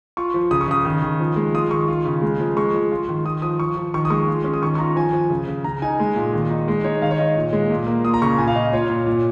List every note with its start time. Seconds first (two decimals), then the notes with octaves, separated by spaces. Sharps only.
0.17 F4 C#6
0.34 F3
0.51 C#3 D#6
0.61 C#6
0.68 C#3 D#6
0.85 D#3
1.03 D#3
1.20 F3
1.36 G#3
1.55 F4 D#6
1.71 D#3 C#6
1.88 F4
2.05 C#3
2.22 G#3
2.40 F3
2.57 G#3 C#6
2.74 F3
2.91 F4
3.09 D#3
3.25 F4 D#6
3.42 F3 D#6
3.59 F3 C#6
3.77 F3
3.94 D#3 C#6
4.05 D#6
4.10 G#3 C#6
4.28 F4
4.44 C#4
4.53 D#6
4.62 D#3 C#6
4.75 C#6
4.79 F4 A#5
4.96 F3 G#5
5.13 F3
5.30 C#3
5.48 C#3
5.64 C#3 A#5
5.82 D#4 G#5
6.00 G#3
6.16 A#2
6.33 D#3
6.50 D#4
6.68 G#3
6.84 D#4 C#5
7.02 D#3 F5
7.11 C#5
7.19 D#3 D#5
7.36 A#2
7.53 G#3
7.70 A#2
7.87 A#3
8.04 F4 D#6
8.14 A#5
8.22 C#3 C#6
8.38 A#2 G#5
8.48 F5
8.56 A#2 D#5
8.73 F4 C#5
8.90 A#2
9.07 A#2